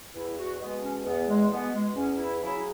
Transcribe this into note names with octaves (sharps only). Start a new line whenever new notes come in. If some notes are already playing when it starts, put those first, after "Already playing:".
E2 E4
F#4
B2 G#3 B3
C#4
E2 B3
G#3
B2 G#3 B3
G#3
E2 C#4
E4
C#3 F#3 E4